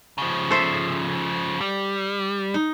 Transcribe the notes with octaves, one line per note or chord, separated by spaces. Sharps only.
C#3 F3
A4 C5 E5
G3
D#4